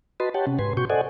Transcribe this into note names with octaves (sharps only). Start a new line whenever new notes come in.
F#4 B4 D#5 A5 B5 C6
G4 C#5 F#5 G5 A5
C3 C#4
G#2 B4 G#5 C6
B2 F#4 C#6 G6
A4 C5 D5 D#5 F#5 G#5